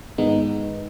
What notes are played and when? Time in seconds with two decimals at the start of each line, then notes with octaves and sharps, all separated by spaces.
0.18 G#2 D#3 G#3 B3 D#4